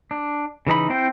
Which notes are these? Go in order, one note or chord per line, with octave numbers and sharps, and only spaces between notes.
D4
C#3 E3 D#4 B5
C4 E4 C5 G5